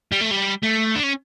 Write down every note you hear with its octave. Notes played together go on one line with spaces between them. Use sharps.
G3
A3
G3
A3
D4
C#4